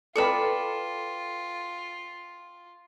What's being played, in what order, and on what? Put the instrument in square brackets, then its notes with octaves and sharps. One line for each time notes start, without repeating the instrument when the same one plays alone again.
[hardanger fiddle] F4 [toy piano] A4 B4 [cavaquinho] D5 A5 B5 [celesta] G5 C#7